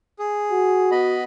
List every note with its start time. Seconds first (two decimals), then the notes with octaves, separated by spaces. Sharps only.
0.19 G#4
0.51 F#4
0.91 B3 D#5 B5